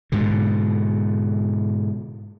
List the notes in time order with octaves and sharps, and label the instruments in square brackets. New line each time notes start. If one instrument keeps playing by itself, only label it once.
[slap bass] G#2 B2 D3